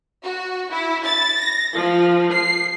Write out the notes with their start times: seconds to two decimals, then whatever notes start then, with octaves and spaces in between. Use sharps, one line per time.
0.24 F#4
0.70 E4
1.05 A6
1.39 A#6
1.74 F3
2.33 C7